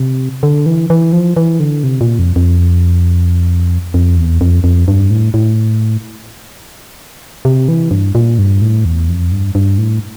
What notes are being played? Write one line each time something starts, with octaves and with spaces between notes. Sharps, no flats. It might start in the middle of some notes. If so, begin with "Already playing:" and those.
Already playing: C3
D3
E3
E3
F3
E3
D3
C3
A#2
F2
F2
F2
E2
F2
F2
G2
A2
A2
C3
E3
G2
A#2
G2
A2
E2
F2
G2
G2
A2